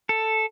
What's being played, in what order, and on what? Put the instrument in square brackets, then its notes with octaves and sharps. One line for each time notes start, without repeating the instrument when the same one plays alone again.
[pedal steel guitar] A4